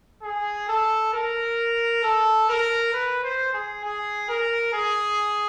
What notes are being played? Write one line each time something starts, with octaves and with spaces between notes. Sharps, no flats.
G#4
A4
A#4
A4
A#4
B4
C5
G#4
G#4
A#4
G#4